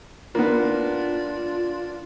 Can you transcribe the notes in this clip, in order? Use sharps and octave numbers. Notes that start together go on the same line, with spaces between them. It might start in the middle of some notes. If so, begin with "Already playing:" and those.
A#3 B3 D4 F4